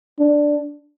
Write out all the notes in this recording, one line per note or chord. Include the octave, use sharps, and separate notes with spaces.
D4